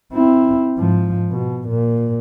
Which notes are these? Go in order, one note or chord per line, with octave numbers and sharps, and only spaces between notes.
C4 E4
G#2 F3
B2
A#2